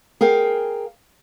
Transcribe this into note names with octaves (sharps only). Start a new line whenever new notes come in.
G#4 A#4 F5 G5